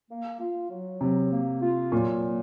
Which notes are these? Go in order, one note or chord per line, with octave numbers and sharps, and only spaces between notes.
A#3
F4
F#3
C3 F#3
A#3
F4
A#2 F#3
A#3